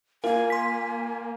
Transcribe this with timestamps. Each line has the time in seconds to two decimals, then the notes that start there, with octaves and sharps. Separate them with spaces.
0.24 A#3 F4 A#4 G#5
0.50 C6 B6